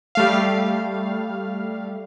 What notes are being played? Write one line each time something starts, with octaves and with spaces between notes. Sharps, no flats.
G3 A3 F5